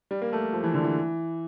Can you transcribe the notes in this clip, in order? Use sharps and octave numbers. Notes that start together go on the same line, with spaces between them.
G3
A#3
A3
F3
E3
D3
E3